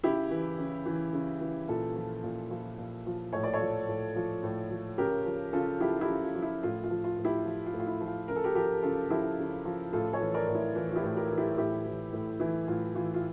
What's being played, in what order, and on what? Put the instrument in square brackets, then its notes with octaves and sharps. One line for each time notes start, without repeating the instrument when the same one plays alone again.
[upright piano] C#3 E4 G4
E3
C#3
E3
C#3
E3
A#2 F4 A4
F3
A#2
F3
A#2
F3
A2 C#5
D5
A4 C#5
F3
A2
F3
A2
F3
C#3 G4 A#4
F3
C#3 F4 A4
F3 E4 G4
E4 G4
C#3
F4
F3
E4
A2 F4
F4
F3
F4
A2
E4 G4
F3
F4
A2
F4
E4
F3
F4
C#3 A#4
A4
G4 A#4
F3 G4 A#4
C#3 F4 A4
F3 E4 G4
C#3
F3
A2 F4 A4
A4 C#5
E3
A#4 D5
A2
E4
E3 F4
F4
E4 G4
A2
G4 A#4
E3
E4 G4
A2 E4 G4
E3
A2
E3 E4
A2 F4
E3 F4
F4